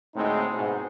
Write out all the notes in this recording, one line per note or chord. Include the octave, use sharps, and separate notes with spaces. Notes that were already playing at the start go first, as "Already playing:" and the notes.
D2 A2 G#3 C4 D#4
G#2 B2